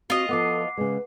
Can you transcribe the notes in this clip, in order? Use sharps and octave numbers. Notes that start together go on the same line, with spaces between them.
C4 F4 F#4 D#5
F3 B3 A4 F#5 D6 C7
C#3 G#3 B4